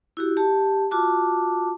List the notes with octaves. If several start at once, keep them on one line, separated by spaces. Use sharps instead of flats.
E4 F#4 G4
G4 A5
F4 F#4 A5 D6